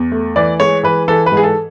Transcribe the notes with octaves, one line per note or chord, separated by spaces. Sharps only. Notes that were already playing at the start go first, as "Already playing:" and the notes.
Already playing: E2
A3
E3 D5
G#3 C#5
E3 B4
E3 A4
B4
G#2
G#4
A4